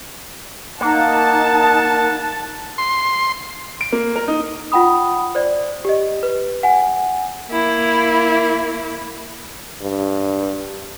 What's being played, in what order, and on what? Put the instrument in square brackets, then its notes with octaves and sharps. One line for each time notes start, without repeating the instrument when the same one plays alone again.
[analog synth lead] A#3 [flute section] D#4 [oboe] F#5 [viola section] A5
[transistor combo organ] C6
[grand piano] D7
A#3
A#4
D#4
[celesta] F4 F#5 G5 B5 D#6
C5 D5
G4 D#5
B4
F#5 G#5
[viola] A#3 E4
[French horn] G2